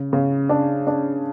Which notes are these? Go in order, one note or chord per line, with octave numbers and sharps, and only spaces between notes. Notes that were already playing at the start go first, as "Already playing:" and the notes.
Already playing: C#3
C#3
D4
D4